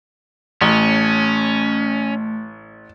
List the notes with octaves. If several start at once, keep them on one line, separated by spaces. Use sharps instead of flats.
A1 A3 C#4